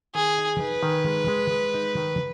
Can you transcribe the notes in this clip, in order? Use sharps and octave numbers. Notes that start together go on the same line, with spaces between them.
D#3 G#4
D#4
D#4 B4
D#3
G#3
G#3
G#3
D#4
D#3